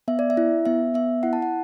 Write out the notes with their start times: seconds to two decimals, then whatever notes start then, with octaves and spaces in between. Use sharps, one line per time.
0.08 B3 E5
0.19 D5
0.30 E5
0.37 E4
0.65 B3 E5
0.94 B3 E5
1.23 E4 F#5
1.33 A5
1.42 F#5